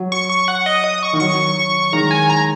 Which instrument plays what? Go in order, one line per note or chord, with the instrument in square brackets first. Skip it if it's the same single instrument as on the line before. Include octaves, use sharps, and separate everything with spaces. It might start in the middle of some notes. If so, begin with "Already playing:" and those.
Already playing: [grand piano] F#3
[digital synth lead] C#6
C#6
F#5
D#5
D#6
C#6
[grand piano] D#3
[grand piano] F#3 [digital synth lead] C#6
[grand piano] D#3 G#3 [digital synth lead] A#5
[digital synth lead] G#5
A#5